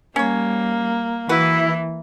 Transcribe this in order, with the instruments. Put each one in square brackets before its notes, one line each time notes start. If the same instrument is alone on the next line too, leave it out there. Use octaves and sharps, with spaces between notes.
[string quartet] G3 [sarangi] A#3 [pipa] C#4 C#5
[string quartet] E3 [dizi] E4 [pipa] F#4 B4